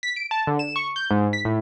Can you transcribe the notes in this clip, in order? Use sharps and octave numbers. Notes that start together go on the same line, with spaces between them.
B6
D7
A5
D3
E7
C#6
G6
G#2
B6
A2